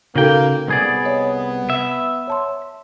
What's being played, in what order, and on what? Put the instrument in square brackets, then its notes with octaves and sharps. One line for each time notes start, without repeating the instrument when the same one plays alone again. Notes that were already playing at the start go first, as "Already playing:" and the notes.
[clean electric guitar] C#3 G5 [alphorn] A#3 [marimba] D#4 F#4 A4
[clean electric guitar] C2 G#4 D5 [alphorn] B3
[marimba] C#5 D#5
[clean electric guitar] E5
[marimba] C#5 A5 C6